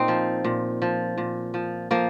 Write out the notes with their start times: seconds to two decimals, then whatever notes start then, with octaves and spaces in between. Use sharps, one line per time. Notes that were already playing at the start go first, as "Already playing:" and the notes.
Already playing: A#2 C4 D#4
0.08 F3
0.45 A#2
0.82 F3
1.18 A#2
1.54 F3
1.91 F3 A#3